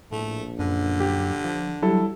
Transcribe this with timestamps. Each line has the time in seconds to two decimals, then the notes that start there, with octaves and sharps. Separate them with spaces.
0.12 A#1 A2 A3
0.59 F#2 D3
1.00 G4
1.44 F3
1.82 F#3 G3 E4 A4